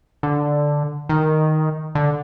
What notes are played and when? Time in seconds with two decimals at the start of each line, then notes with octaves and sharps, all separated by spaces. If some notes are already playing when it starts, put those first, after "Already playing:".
0.23 D3
1.09 D#3
1.95 D3